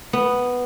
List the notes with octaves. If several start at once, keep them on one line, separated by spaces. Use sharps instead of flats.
B3